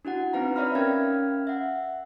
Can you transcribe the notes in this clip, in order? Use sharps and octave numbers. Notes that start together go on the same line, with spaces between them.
D4 E4 F#4 F#5
C4 D#4 B4 F5 A#5
C#5 D5 E5 F5 B5 F6
C#4 A#4 F5 G5 F6 G#6
E5 F#5